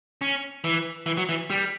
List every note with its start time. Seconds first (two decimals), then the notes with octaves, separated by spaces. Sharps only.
0.21 C#4
0.64 E3
1.06 E3
1.17 F#3
1.29 E3
1.50 G3